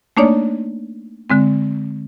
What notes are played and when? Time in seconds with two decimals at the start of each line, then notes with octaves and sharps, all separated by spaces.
0.17 A3 A#3 D4 D#4 C#5 D5
1.30 D3 G#3 C4